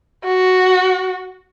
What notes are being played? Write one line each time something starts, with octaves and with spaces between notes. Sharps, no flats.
F#4